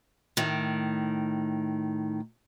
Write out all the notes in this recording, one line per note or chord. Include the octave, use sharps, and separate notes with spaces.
A2 D#3